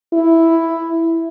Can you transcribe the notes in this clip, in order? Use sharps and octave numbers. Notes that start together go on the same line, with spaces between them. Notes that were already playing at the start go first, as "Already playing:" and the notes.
E4